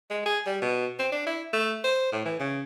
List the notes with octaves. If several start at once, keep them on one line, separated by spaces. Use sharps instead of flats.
G#3
G#4
G3
B2
C4
D4
E4
A3
C5
A2
E3
C#3